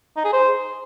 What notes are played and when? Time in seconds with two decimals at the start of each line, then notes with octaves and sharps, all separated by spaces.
0.16 D#4
0.24 G#4
0.32 C5